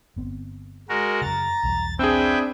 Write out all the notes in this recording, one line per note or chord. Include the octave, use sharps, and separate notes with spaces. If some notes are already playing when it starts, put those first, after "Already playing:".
G1 B3 C4
G#3 F#4 A#4
F#2 C#3 A#5 A6
B1 E2 G3
C4 D4 G#4 B4 E5 G5